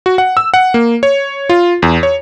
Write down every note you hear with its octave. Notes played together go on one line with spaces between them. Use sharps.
F#4
F#5
E6
F#5
A#3
C#5
F4
E2
C#5